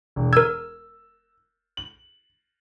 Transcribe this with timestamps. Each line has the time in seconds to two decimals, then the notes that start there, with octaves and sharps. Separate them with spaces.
0.16 E1
0.33 A#4 E6 G#6
1.77 F#7